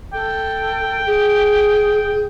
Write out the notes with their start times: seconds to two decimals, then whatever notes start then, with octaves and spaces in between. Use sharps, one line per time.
0.13 A4 G5
1.06 G#4